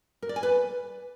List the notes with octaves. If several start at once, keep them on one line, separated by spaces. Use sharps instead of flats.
A#4
D5
G#5
B4